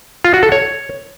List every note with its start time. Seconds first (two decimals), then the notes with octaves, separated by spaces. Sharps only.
0.24 F4
0.34 F#4
0.43 A4
0.52 C#5